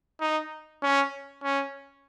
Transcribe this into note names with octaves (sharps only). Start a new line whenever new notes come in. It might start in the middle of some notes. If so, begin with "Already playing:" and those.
D#4
C#4
C#4